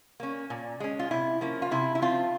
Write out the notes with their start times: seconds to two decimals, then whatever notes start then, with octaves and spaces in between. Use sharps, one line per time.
0.20 A#3 C#4
0.50 A#2
0.80 G#3 C#4
0.99 F4
1.11 C3 E4
1.41 F3 A#3 C#4
1.62 F4
1.71 C3 E4
1.95 E4
2.02 F3 C4 F4